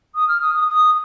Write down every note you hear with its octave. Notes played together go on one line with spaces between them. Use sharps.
D#6
F6
D#6
D#6
D#6